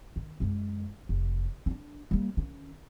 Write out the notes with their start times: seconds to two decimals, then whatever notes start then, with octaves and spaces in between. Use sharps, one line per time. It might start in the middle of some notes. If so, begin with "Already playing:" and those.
0.16 D#3
0.40 F#2 G#3
1.09 F1
1.66 C#4 D4
2.11 G3 A#3
2.37 D#3 C#4